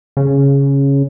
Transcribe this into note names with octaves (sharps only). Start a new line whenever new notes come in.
C#3